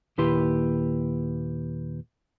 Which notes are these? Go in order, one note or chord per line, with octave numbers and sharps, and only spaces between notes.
D#2 A#2 E4 G4 B4 C6